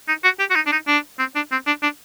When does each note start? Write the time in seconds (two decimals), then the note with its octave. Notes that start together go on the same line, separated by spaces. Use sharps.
0.08 D#4
0.24 F#4
0.39 G4
0.51 F#4
0.55 D#4
0.67 D4
0.72 D#4
0.88 D4
1.19 C4
1.35 D4
1.52 C4
1.67 D4
1.83 D4